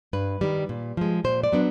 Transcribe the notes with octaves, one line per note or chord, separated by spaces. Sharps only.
G2 B4
D#3 G3
A#2
F3 G#3
A#2 C5
D5
F#3 B3 D4